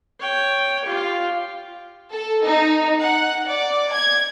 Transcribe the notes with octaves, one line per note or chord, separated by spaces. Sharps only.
C#5 G5
F4 G4
A4
D#4
F#5
D5
G#6